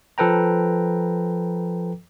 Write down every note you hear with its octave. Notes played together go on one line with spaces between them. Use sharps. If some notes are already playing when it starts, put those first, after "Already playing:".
F3 A4 B4 G5 A#5